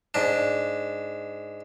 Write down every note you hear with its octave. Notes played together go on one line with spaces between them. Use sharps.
G#2 D4